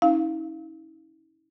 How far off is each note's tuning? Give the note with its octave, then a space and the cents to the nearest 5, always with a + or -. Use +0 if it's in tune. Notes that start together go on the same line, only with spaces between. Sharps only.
C#4 +10 E4 -40 F5 -10